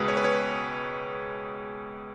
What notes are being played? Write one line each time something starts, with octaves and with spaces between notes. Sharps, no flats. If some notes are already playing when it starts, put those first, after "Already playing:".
Already playing: C#2 B2 G#3 G#4 B4
C#5
B4
C#5